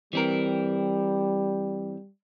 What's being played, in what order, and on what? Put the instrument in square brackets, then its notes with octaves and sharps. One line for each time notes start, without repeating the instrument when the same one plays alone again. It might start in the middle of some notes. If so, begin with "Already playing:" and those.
[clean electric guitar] E3 C4 A#4 [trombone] G3